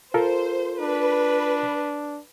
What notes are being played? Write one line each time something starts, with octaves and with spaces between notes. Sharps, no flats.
F4 A4 A#4 C5
D4 B4